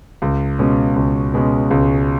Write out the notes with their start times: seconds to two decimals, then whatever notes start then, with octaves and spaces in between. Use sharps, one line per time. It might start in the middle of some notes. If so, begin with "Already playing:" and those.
0.22 C#2
0.59 B2 G#3 C#4
0.96 C#2
1.34 B2 G#3 C#4
1.71 C#2